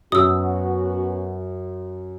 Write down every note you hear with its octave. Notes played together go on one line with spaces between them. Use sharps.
F#2 B3 C#4 F#4 D#6 E6